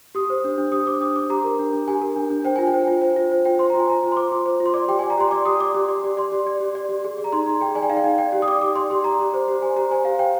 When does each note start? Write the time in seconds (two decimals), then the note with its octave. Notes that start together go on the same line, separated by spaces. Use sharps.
0.15 G4 D#6
0.30 C5
0.44 D4
0.58 D4
0.72 G4 D#6
0.86 C5 D6
1.01 D4 D#6
1.16 D4 D6
1.30 G4 A#5
1.44 A#4
1.59 D4
1.73 D4
1.88 G4 G#5
2.02 A#4
2.16 D4
2.30 D4
2.45 C5 G5
2.56 F4 G#5
2.67 G5
2.74 C5
2.88 F4
3.02 C5
3.16 F4
3.31 C5
3.45 F4 G5
3.59 C5 C6
3.70 F4 A#5
3.80 G#5
3.88 C5 A#5
4.03 F4
4.12 C6
4.17 C5 D6
4.32 F4
4.46 C5
4.60 F4
4.66 C6
4.74 D5 D6
4.88 G4 G5
4.99 D5 G#5
5.10 A#5
5.18 G4 C6
5.31 D5 D6
5.45 G4 D#6
5.60 D5 D6
5.74 G4
5.88 D5
6.04 G4
6.17 D5 C6
6.32 G4
6.47 D5
6.60 G4
6.75 D5
6.89 G4
7.04 G#4
7.18 D5
7.24 A#5
7.33 D#4 C6
7.46 D#4 A#5
7.61 G#4 G5
7.75 D5 G#5
7.82 G5
7.89 D#4 F5
7.97 G5
8.04 D#4
8.18 D5 G5
8.32 G4
8.42 D#6
8.48 D5 D6
8.61 G4 D6
8.75 D5 C6
8.90 G4 C6
9.04 D5 A#5
9.20 G4
9.34 C5
9.48 G4
9.62 C5 G#5
9.76 G4 A#5
9.91 C5 G#5
10.05 G4 F5
10.19 C5 G5